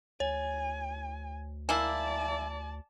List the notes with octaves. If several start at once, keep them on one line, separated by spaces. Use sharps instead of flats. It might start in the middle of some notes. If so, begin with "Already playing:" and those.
D2 C#5 G#5
A#3 E4 D5 G#5 A5